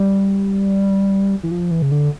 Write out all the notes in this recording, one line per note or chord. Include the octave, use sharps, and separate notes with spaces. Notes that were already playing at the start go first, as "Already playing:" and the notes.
Already playing: G3
E3
F3
E3
C#3
D3